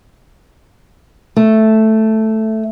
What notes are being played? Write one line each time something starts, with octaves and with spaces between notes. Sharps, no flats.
A3